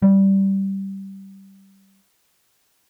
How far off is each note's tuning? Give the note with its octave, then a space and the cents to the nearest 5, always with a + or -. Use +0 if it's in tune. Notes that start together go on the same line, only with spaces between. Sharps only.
G3 -10